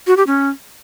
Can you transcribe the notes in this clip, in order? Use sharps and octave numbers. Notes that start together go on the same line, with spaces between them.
F#4
G4
C#4